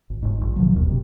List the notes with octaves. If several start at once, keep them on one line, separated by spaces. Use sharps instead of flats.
G#1
G1 G#2
A#1
B2 D#3 F3 F#3
F#1 D#2 B2
F#2 C3